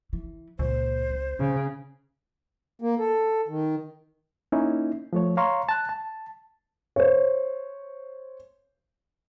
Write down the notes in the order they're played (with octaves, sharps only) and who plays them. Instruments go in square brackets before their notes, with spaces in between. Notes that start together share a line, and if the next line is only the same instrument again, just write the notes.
[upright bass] E3
[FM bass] C#2 [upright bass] A#2 [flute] C5
[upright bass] C4
[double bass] C#3
[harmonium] A#3
A4
D#3
[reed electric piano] A#3 C#4 D#4 E4
F3 A3 C#5
C#5 F5 A#5 C6 C#6
A5 F#6
A5
[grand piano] C5 C#5